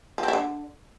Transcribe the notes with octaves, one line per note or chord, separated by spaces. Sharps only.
F3
C4
E4
D3